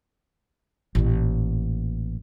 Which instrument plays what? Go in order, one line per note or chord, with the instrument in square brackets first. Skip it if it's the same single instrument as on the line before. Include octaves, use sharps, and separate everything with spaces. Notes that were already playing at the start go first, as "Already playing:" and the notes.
[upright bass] A1 A#2